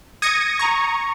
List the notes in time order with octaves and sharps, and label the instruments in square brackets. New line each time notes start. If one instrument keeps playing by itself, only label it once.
[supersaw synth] D#6 G#6 A#6 C#7 D#7
A#5 C#6